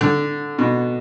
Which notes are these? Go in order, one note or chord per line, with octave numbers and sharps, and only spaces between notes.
D3
B2